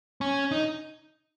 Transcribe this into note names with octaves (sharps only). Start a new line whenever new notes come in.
C#4
D#4